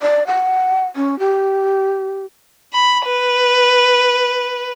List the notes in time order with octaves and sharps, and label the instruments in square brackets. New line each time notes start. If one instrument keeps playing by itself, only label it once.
[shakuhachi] D5
F#5
C#4
G4
[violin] B5
B4